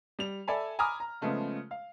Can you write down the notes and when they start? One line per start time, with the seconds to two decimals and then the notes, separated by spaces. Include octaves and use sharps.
0.19 G3 F7
0.48 A4 D5 E5 G#5 A5 B5
0.79 G#5 A#5 B5 D6 D#6 F6
1.00 A#5
1.21 C#3 F3 G#3 A3 B3
1.71 F5